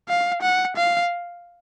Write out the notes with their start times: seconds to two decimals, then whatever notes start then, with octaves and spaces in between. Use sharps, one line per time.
0.09 F5
0.42 F#5
0.76 F5